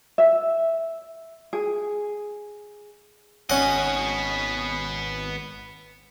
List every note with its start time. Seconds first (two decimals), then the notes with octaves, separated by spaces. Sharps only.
0.18 E5
1.53 G#4
3.50 G#1 B3 C#4 D#5 F#5